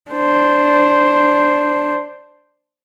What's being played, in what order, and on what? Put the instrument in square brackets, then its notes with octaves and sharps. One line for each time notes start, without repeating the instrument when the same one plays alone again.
[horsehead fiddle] D4 C5